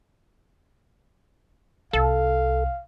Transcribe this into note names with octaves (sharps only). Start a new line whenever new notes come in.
C2 A4 F5